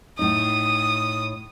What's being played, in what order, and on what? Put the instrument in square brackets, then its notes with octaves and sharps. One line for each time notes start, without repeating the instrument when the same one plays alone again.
[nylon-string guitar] A2 D#4 [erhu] D#6